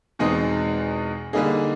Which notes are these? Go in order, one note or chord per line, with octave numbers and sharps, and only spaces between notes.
E2 B2 G#3 C4 D#4
D3 G3 A#3 D#4 G#4